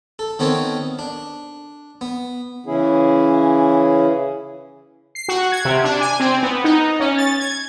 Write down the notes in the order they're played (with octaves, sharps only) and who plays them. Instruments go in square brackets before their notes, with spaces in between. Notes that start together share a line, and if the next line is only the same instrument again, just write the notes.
[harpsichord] A4
D#3 B3 C4 A4 C#5
D4
B3
[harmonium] C#3 E3 C#4 E4 G#4
[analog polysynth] C7
F#4
G#6
C3
D4
G#5
C4
B3
D#4
C#4
A6
G#6